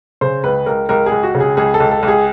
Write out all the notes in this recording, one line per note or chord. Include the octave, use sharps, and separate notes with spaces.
C#3 C5
C#2 B4
C#2 A#4
C#2 A#4
G#4
C#2
F#4
C#3
G#4
C#2 G#4
A4
C#2
A4
C#2
G#4